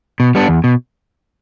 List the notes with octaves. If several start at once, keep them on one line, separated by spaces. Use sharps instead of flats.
B2
G3 B3 D4
E2
B2